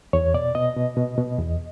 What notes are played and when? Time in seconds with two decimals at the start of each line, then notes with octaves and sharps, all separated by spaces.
0.13 E2 C#5
0.34 B2 D5
0.55 B2 D#5
0.76 B2
0.97 B2
1.18 B2
1.38 E2